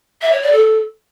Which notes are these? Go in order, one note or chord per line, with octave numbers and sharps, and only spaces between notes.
E5
C#5
D5
A4